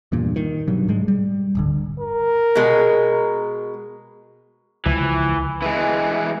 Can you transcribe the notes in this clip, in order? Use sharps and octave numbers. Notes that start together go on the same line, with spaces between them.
E2 G2 A#2
D#3
G2 B2 F#3
G#2 G3 G#3
G3
D1 G1 D3
A#4
B2 G#3
C#2 E3 F3
E3 G#3